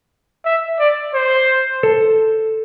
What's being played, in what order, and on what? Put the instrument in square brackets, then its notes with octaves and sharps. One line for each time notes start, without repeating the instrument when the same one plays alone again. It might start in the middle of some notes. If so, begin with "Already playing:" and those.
[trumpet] E5
D5
C5
[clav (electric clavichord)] A4